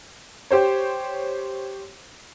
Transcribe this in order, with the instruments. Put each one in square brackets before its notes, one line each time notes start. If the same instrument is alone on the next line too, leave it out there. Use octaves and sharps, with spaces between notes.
[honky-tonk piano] G4 C5 C#5